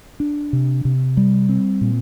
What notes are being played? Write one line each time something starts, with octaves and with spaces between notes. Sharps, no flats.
D4
C3
C3
G3
C4
A#2